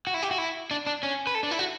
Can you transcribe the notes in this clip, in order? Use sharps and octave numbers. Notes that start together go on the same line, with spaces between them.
F#4
E4
G4
F#4
E4
D4
D4
C#4
B4
A4
D4
E4
F#4